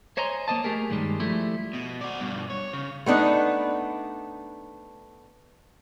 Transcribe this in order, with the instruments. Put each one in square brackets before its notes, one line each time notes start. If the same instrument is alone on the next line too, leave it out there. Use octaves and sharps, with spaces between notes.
[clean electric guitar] C5 C#5 D#5 G#5 A#5 C6
A#3 C5 D#5 A5
A3 G4 G#4 A#4
G2 D#3 E3 G3 G#3
F3 G3 A3 E4
[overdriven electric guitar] B2
F#4 D5
G2 B2
C#5
C#3
[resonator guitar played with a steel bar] A3 B3 D4 D#4